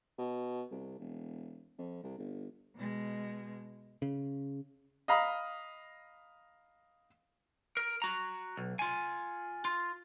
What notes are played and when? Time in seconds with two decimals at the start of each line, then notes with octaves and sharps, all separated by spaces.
0.18 B2
0.71 C2
0.99 E1
1.78 F2
2.03 C2
2.18 G1
2.76 B2 G#3
4.02 C#3
5.08 D#5 F5 A#5 B5 D#6
7.77 A#4
8.02 F#4 A#5
8.57 B1
8.79 F4 G#5
9.65 F4